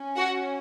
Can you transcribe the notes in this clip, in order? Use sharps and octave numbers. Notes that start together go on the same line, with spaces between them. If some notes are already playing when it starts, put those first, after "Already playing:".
Already playing: C#4
F#4 F#5